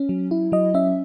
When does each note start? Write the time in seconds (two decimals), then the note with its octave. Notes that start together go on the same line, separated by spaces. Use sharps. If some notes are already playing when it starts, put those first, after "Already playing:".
Already playing: C#4
0.09 F#3
0.31 E4
0.52 F#3 D#5
0.74 C#4 E5